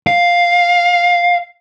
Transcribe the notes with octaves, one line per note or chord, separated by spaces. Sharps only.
F5